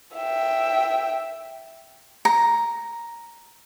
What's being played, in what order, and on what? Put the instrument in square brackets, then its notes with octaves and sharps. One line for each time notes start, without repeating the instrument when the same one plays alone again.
[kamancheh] E5 G5
[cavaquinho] A#5